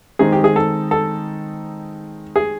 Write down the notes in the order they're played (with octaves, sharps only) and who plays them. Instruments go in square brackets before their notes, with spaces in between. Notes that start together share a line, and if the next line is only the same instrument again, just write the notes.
[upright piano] D#3 G#3 C4 D#4 [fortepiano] G#4
[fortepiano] G4
G#4
A4
A4
G#4